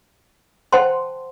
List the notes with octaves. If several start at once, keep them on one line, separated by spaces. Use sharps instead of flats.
C5 F#5 G5 A5 C6